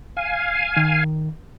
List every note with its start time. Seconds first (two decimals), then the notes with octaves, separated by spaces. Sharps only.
0.17 F5 G#5
0.77 D#3